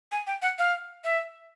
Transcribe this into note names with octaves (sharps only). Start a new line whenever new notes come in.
G#5
G5
F#5
F5
E5